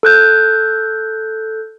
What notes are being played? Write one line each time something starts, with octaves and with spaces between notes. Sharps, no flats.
A4 F#6 G6